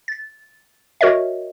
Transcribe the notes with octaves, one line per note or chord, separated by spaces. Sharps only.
A6
F#4 A#4 C#5 D#5 E5